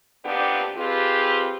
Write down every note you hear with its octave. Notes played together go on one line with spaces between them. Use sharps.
F2 A#2 B3 D4 G4
F2 C4 F4 G4 G#4 B4